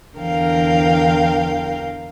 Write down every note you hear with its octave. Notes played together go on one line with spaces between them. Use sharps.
E2 D3 E3 A#4 F5 G5